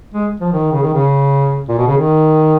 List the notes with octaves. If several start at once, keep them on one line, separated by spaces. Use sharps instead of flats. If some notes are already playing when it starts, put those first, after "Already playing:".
G#3
F3
D#3
C#3
D#3
C#3
A#2
B2
C#3
D#3